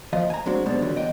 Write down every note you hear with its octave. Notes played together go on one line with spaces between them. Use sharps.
D#2 F3 D#5 F5
G#5 A#5
F#3 G#3 C4 D4 F#4
F#2 B2 G3 G#3 C4 D4
F2 D3 D#3 F#3 G3
E2 D#5 G5